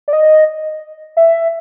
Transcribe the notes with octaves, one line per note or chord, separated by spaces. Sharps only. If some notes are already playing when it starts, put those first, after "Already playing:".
D5
D#5
E5